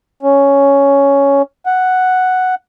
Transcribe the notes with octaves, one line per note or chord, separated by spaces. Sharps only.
C#4
F#5